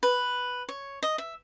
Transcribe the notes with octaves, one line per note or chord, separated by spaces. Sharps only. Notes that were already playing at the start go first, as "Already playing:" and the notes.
B4
C#5
D#5
E5